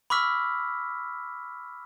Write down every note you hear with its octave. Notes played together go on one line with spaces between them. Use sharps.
B5 C#6 D6 E6 F6 B6